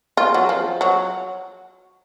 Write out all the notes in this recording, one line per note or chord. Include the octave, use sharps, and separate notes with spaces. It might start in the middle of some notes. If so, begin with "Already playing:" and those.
F4
F#3
F3
F#3